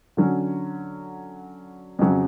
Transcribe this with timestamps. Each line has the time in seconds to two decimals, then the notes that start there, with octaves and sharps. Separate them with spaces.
0.17 D3 F#3 C#4
1.99 F2 C#3 F#3